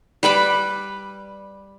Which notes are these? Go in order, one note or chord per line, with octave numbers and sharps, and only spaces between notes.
G3 B4 B5 D6